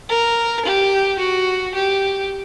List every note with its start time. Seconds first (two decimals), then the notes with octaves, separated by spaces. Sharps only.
0.09 A#4
0.65 G4
1.19 F#4
1.74 G4